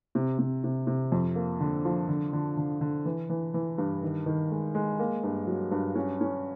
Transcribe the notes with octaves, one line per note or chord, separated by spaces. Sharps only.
C3
C3
C3
C3
F2
A#3
D3
F3
D3
D3
D3
D3
E3
E3
E3
G2
D#3
D#3
G#3
G#3
A#3
G2
F#3
G2
C#4
C#4